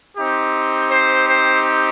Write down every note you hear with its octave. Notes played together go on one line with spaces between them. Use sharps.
C4 D#4 G4
C5
C5